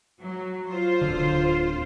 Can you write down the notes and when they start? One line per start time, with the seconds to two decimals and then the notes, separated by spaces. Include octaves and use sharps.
0.21 F#3
0.67 F4 C5
1.01 D1 G#1 D3